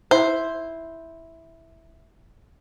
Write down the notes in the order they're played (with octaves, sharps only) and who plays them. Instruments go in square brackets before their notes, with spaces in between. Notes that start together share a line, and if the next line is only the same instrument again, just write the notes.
[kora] E4 [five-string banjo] C5